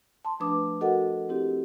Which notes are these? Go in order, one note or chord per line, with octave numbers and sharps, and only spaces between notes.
A5 C6
F3 A3 D4 B4 D6 D#6
F#4 A4 A#4 D#5 F#5
C4 E4 G4